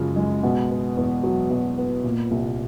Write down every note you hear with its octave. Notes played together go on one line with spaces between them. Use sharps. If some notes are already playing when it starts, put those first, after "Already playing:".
Already playing: F#2 C#3 F3 G#3
G#3
B2
B3
E2
F#3
B2
B3
A#2
C2